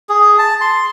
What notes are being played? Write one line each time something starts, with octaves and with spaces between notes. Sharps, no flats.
G#4
A5
C6